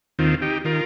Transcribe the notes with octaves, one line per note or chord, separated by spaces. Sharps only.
D#2 D#3 C4 F4
D#4 G4
D#3 F4 A#4